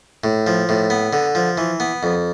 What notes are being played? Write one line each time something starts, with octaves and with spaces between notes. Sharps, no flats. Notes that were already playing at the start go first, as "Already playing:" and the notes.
A2
F3
A2
B3
D3
F3
E3
B3
F2